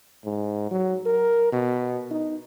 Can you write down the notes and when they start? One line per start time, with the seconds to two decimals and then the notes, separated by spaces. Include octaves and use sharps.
0.25 G#2
0.71 F#3
1.06 A#4
1.52 B2
2.11 D#4